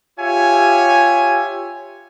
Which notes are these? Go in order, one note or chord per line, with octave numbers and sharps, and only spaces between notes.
F4 G4 C#5 E5 G#5